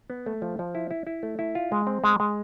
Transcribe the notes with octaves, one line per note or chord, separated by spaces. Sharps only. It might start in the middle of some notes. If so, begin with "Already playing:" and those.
B3
A3
F3
F3
E4
E4
E4
A3
E4
F4
G#3
C4
G#3
G#3